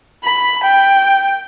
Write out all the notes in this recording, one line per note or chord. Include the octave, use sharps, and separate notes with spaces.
B5
G5